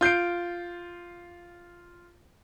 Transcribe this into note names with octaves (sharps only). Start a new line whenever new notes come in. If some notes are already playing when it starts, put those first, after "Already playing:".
F4 G6 C7 D7